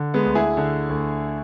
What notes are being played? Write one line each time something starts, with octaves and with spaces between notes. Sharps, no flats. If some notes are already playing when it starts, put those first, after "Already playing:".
Already playing: D3
G#3 B3
D2
E4 G#4
D3
D2